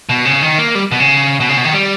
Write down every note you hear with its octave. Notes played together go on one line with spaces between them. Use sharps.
B2
C#3
D#3
A#3
G3
B2
C#3
B2
C#3
B2
D#3
G3